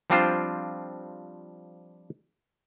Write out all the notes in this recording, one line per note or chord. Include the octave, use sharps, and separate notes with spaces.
F3 G3 C4 D4 F4 C5